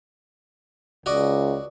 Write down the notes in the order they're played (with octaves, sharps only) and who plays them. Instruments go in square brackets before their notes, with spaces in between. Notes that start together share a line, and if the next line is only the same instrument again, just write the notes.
[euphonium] C#2 [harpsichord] F#4 D5 D#5